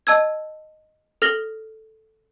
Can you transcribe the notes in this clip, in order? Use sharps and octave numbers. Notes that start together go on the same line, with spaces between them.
D#5 A5 E6 G#6
A4 F6 A#6 F#7 G7